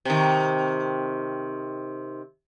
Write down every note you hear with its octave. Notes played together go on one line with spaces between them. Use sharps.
C3 D#3